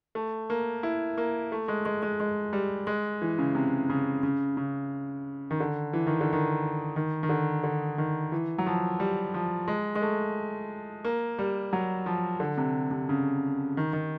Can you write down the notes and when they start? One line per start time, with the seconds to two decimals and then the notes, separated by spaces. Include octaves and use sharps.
0.15 A3
0.50 A#3
0.83 E4
1.18 A#3
1.52 A3
1.68 G#3
1.85 G#3
2.03 G#3
2.20 G#3
2.53 G3
2.87 G#3
3.22 E3
3.39 C#3
3.55 C3
3.90 C#3
4.23 C#3
4.57 C#3
5.51 D#3
5.60 D3
5.93 E3
6.07 D#3
6.21 D3
6.33 D#3
6.96 D#3
7.23 D#3
7.29 D3
7.63 D3
7.98 D#3
8.32 E3
8.58 F#3
8.66 F3
9.00 G3
9.34 F3
9.68 G#3
9.95 G#3
10.02 A3
11.05 A#3
11.39 G3
11.73 F#3
12.06 F3
12.40 D3
12.58 C3
12.91 C3
13.09 C#3
13.77 D#3
13.93 D#3